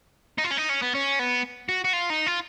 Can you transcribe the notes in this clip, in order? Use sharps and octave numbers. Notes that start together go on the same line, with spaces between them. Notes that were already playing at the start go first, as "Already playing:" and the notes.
D#4
F4
C#4
D#4
C#4
B3
C#4
B3
F#4
F#4
F4
D#4
F4